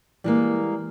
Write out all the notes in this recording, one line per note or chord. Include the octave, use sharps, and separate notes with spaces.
E3 G3 G#3 A#3